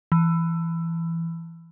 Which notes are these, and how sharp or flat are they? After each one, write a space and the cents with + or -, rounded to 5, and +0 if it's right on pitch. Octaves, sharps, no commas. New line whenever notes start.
E3 +15